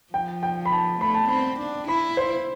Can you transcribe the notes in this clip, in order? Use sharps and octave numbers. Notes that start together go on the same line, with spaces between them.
F3 G5
G5
B5
A5
A3 B5
A5
C4 B5
D4
E4 B5
C5